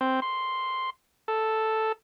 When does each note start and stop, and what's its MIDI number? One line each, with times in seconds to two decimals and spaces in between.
0.01 0.20 60
0.22 0.90 84
1.28 1.92 69